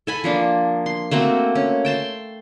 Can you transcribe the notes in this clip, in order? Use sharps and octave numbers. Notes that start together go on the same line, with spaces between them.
A4 G#5 B5
F3 A#3 D4
C6
A3 A#3 C4 F#4
C#4
G5 A5 C6